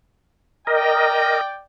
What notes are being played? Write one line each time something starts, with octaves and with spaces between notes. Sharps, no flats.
A#4 D5 D#5 G5